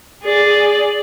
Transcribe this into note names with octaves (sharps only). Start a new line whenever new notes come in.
G#4 D5